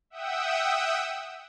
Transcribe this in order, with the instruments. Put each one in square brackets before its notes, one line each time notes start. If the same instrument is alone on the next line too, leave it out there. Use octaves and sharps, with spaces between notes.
[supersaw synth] E5 F#5 G5 D#6 E6